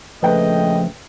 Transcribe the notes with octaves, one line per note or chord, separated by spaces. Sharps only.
A#1 C#3 F3 A3 B4 D#5 G5